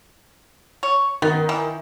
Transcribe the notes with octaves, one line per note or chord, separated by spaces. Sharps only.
C#5
D#3 B3
E3